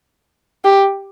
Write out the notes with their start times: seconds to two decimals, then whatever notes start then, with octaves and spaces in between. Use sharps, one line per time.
0.65 G4